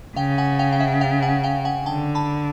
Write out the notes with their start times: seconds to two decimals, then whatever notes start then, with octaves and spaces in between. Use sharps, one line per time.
0.16 C#3 F5 G5
0.38 F#5 G#5
0.59 F5 G5
0.73 G5
0.80 E5 F#5
1.01 F5 G5
1.22 F#5 G#5
1.43 F5 G5
1.65 F#5 G#5
1.86 D3 G5 A5
2.15 A5 B5